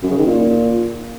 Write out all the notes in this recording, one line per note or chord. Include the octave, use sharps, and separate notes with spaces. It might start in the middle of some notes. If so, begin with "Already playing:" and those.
F#2
C#3
D#3
A#2